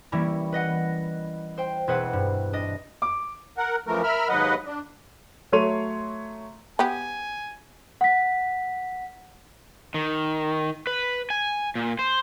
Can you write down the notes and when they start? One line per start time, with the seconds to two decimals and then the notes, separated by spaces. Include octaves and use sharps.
0.12 E3 G3 A#3 C#4 E4
0.52 B4 D#5 F#5
1.58 C5 G5
1.87 E1 C4 G#4 B4 C5 F#5
2.13 G2
2.53 D4 D#5
3.02 D6
3.57 A#4 F#5
3.87 F#2 E3 F3 A3 A#4
4.03 A#4 E5 B5 F6
4.29 D#2 G#2 F#3 B4 D#5 F#5
4.66 D4
5.52 F#3 A3 C#5 C6 D#7 F7
6.79 B3 G4 G#5
8.01 F#5 B6
9.94 D#3
10.87 B4
11.30 G#5
11.75 A#2
11.99 C5